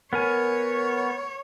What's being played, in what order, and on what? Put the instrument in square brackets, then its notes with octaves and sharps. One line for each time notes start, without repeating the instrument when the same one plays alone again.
[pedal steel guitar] B3 A#4 G#5 [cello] C#5